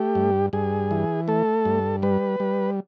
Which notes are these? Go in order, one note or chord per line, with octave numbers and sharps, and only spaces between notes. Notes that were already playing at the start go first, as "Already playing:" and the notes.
Already playing: A3 G4
G2
G2 G#4
E3
A3 A4
G2
G3 B4
G3